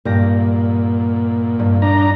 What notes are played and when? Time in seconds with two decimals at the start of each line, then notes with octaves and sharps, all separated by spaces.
0.05 G2 A#2 G4 A#6
1.59 G2
1.82 D4 A#5